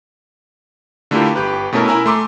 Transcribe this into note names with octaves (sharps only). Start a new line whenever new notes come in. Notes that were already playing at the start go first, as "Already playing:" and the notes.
D3 A3 E4 F4 G4 A#4
G1 G4 B4
B2 A3 C#4 E4 A#4
E4 A#4 G#5 A#5 E6
A3 C6 D6